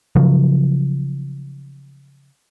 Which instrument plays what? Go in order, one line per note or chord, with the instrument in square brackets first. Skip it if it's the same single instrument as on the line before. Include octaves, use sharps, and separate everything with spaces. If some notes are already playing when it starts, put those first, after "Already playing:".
[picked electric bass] C#3 F3 F#3